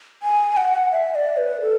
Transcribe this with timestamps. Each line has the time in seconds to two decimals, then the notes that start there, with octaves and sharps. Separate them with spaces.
0.23 G#5
0.57 F#5
0.92 E5
1.15 D5
1.37 B4
1.61 A4